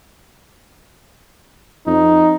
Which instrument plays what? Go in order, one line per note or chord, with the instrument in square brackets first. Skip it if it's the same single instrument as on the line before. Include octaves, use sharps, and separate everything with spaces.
[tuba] F2 [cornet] D#4